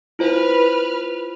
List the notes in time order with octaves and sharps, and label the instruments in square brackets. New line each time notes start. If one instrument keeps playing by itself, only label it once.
[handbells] E4 F4 C5 [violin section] B4 F6